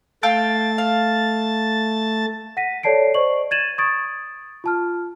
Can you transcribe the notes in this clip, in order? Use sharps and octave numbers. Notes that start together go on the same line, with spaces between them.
A3 F5 G5 A5 E6 A6
F5
F#5 A#6 B6 D#7
A4 C#5 D5 A5 C7 D7
C5 D5 D#5 C#6 F#7
G#6 A6 D#7 E7 F#7
C#6 D#6 G#6 A6 D7
F4 A5 F6